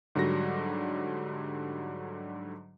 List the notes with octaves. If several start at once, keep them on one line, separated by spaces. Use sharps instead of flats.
G#2 D3 F#3 G3 F#4 A#6